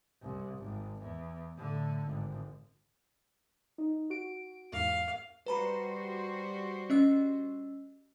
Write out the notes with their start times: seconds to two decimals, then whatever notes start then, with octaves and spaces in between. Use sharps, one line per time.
0.22 C2
0.58 G#1
1.03 E2
1.57 A2 D3
2.06 G#1
3.78 D#4
4.10 F#4 D7
4.73 E2 G#2 F5
5.46 G3 F#4 B4 C5 A#5 B5
6.90 C#4 D#5 E6